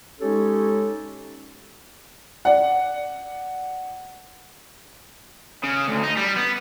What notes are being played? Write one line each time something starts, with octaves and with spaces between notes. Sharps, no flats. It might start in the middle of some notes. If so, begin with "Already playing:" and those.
G#3 C#4 D#4 G4 A4 C#5
D5 F#5
C#3
D2
D#4
G3
B3